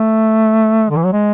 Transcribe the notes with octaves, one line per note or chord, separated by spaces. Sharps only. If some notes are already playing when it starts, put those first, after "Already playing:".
Already playing: A3
D3
E3
F#3
G#3